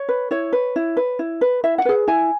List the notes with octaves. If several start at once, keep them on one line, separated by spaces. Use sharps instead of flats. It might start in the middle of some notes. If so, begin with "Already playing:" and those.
Already playing: C#5
B4
E4 C#5
B4
E4
B4
E4
B4
E4 E5
F#5
G#4 B4
E4 G#5